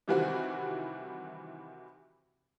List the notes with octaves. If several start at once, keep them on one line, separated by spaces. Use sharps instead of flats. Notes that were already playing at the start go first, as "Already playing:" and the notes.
C3 D#3 E3 G3 C4 F#4